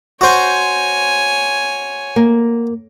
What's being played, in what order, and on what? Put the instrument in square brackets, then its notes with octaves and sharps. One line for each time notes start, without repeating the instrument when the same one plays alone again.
[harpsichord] F#4 C5 [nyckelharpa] C#5 G#5
[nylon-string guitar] A#3